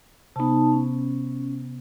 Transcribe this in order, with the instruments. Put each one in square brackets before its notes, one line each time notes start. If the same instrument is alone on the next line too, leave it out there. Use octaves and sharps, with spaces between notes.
[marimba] C3 B3 [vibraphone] D#4 A5
[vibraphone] C#4